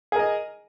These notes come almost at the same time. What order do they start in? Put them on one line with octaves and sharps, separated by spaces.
G#4 A#4 D#5